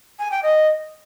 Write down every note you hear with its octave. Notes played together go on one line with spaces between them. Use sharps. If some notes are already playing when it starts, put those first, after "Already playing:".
G#5
G5
D#5